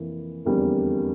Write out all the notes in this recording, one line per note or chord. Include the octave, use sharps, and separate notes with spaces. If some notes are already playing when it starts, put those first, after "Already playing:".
Already playing: F1 F2 E3 A#3
F1 E2 D3 G3 A#3